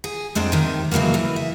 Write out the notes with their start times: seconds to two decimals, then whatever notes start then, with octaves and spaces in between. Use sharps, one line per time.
0.04 G#4
0.35 F2 G#3 C4 D4 G5
0.52 C3 D#3
0.91 C#3 E3 F#3 G#3 A#3
1.14 E3
1.36 E5